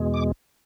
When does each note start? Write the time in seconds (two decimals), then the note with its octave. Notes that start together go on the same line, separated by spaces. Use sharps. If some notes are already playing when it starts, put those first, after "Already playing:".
Already playing: E2 B2 G#3
0.14 D6